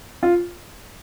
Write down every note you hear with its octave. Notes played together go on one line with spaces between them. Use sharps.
F4